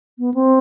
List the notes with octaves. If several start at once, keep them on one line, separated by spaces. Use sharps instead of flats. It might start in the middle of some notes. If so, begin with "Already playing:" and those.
B3
C4